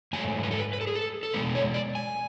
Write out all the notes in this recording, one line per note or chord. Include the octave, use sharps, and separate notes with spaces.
G#2 F#3 A3 G#5
B4
A4
B4
B4
A4
G#4
A4
A4
B2 G#3 B3 B4
C#5
D5
G#5